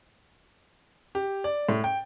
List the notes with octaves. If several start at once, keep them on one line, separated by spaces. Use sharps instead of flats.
G4
D5
A2
G5